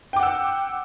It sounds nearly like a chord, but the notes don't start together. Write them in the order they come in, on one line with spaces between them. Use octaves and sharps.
G5 D6 F#5 E6